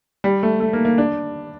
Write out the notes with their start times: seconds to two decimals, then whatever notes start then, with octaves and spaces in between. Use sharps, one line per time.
0.24 G3
0.43 A3
0.60 A3
0.73 A#3
0.85 A#3
0.98 D4